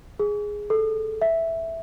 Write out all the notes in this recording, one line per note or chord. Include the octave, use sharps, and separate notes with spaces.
G#4
A4
E5